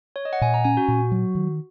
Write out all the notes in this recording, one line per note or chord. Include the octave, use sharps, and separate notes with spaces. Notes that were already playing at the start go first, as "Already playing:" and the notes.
C#5
D#5
F#5
A#2 G#5
A#5
C#4 G#5
F#4
A#2
F#3
D#3